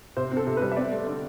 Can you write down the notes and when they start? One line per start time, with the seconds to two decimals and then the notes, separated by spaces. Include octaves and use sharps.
0.17 C3 C5
0.32 C4
0.37 A4
0.47 C3
0.57 B4
0.62 G3
0.72 E5
0.76 C4 D5
0.92 A3
1.07 D3